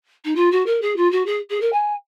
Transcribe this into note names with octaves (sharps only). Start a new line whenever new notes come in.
D#4
F4
F#4
A#4
G#4
F4
F#4
G#4
G#4
A#4
G#5